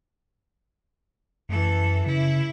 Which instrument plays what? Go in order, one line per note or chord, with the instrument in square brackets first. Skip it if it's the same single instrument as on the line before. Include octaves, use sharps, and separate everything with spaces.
[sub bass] F#2 [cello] E3 A4
[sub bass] C#3 [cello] E4